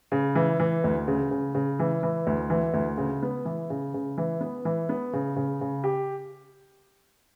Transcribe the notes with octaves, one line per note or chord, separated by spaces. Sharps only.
C#3
E3
E3
D2
C#3
C#3
C#3
E3
E3
D2
E3
D2
C#3
B3
E3
C#3
C#3
E3
B3
E3
B3
C#3
C#3
C#3
G4